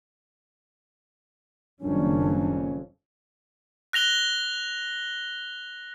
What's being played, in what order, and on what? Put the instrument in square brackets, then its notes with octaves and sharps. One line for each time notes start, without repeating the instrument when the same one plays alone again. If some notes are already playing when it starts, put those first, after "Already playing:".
[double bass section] F#1 D#3 G3 [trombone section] F2 A#2 C#4 [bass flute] D4
[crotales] F#6 A#6 F7 G7